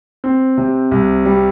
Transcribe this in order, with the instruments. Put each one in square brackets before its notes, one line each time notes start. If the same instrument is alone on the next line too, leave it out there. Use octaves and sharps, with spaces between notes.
[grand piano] C4
C3
C2
G3